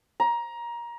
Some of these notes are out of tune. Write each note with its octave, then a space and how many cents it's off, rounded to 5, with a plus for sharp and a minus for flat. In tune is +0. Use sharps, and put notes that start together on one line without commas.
A#5 +20